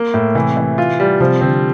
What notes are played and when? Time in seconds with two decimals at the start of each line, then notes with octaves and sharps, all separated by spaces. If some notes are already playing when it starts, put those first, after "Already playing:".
Already playing: A#3
0.14 A2
0.35 C3 E3
0.57 E3
0.78 F4
1.00 G3
1.20 C3 F3
1.41 D3 C4